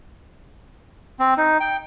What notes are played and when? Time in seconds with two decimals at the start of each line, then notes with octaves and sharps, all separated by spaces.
1.20 C4
1.38 D#4
1.60 G5